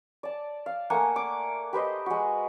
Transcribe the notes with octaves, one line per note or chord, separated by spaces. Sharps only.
D5 A5
F5
A3 A#3 F#5 G#5
D6
G4 B4 C5 D#5
G#3 F#4